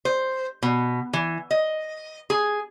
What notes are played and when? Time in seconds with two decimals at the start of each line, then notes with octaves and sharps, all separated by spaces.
0.05 C5
0.62 B2
1.13 E3
1.51 D#5
2.30 G#4